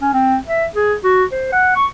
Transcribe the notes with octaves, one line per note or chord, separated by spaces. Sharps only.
C#4
C4
E5
G#4
F#4
C5
F#5
C#6